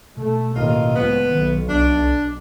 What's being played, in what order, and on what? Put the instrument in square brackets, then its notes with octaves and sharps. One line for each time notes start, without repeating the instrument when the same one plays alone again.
[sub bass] B2 [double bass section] A3
[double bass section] A1 D#2 A2 [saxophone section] F4 A#4 D#5
[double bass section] C#2 F3 [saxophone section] B3
[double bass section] B1 [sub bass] D#3
[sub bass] C2 [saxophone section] D4